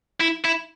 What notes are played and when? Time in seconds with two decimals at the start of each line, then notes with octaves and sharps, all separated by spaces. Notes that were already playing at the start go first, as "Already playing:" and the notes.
0.21 E4
0.45 E4